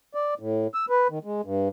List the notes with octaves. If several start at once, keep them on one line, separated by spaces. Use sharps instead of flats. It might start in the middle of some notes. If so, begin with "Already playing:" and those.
D5
A2
E6
B4
D#3
G#3
G2